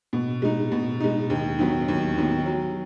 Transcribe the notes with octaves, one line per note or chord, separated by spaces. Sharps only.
B2
G#3 D#4
B2
G#3 D#4
D#2
D#3 F#3 B3
D#2
D#3 F#3 B3
F#3